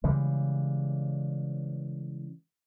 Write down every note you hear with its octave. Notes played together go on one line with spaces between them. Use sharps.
C#3 E3 G3 G#3